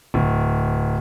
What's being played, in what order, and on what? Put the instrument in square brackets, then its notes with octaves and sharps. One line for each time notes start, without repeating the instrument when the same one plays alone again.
[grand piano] D1